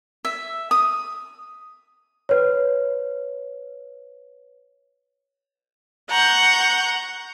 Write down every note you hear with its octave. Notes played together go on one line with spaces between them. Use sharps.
E5
D#6
B4 C#5
F#5 A#5 C#6 G6